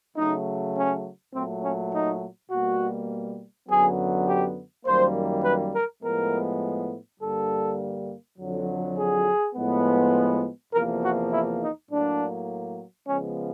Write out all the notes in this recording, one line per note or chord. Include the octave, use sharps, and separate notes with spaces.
C#3 F#3 A3 D#4
C#4
A#2 F#3 A3 C4
C#4
D#4
B2 G3 A#3 F#4
F#2 D3 F#3 B3 G#4
G4
F#2 D#3 G3 A#3 C5
B4
A#4
A2 F3 G#3 B3 A#4
G2 D3 G3 A#3 A4
F2 D3 F#3
G#4
A2 F3 G#3 B3
E2 C3 F3 A#3 A#4
F#4
E4
D#4
A2 F#3 A#3 D4
C#3 F3 G#3 B3 C#4